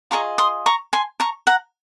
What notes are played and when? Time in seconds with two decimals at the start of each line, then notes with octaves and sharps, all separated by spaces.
0.11 F4 G#4 D#5 A#5 C#6
0.38 C6 D#6
0.66 A#5 C#6
0.93 G#5 C6
1.20 A#5 C#6
1.47 F#5 A#5